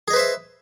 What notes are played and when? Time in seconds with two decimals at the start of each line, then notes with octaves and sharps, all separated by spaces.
0.08 G#4
0.11 D#5
0.13 B4
0.16 C5
0.19 E5